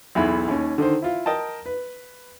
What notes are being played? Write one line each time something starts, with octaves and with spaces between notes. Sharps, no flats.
B1 E2 E4 B5
D#2 C#4
D3 D#3 C5
E4 F4
A#4 D#5 G5 A5
B4